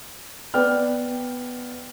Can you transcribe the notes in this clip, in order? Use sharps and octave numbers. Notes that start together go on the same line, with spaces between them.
B3 D5 G5 F6